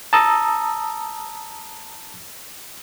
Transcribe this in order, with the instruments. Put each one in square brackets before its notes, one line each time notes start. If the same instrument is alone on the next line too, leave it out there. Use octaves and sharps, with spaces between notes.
[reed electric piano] A5 A#5 D#6 E6